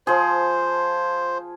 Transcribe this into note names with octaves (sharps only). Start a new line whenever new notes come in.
F3 G#4 C5